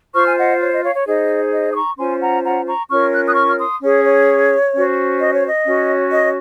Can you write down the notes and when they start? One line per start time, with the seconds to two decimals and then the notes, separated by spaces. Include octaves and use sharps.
0.14 F4 C5 C#6 F6
0.26 G#5
0.38 D#5 F#5
0.61 C#5
0.72 D#5
0.83 C#5 F5
0.95 C#5
1.07 D#4 G#4 C5 D#5
1.53 D#5
1.70 D#6
1.75 A#5 C#6
1.98 C#4 F4 C5 G#5 C6
2.21 F#5 A#5
2.44 F#5 A#5
2.66 A#5 C#6
2.89 C#4 F4 A#4 C#5 C#6 F6
3.13 F#6
3.27 D#6 F#6
3.35 C#6 F6
3.47 F6
3.58 C6 D#6
3.82 C#4 G#4 C#5
4.05 C#5
4.74 C#4 F#4 C5
5.20 D#5
5.33 C#5
5.47 D#5
5.65 C#4 F#4 C#5
6.11 D#5